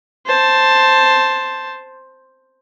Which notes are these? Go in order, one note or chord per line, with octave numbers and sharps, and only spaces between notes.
C5 A5